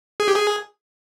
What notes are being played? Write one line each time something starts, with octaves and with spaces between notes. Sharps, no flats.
G#4
G4
G#4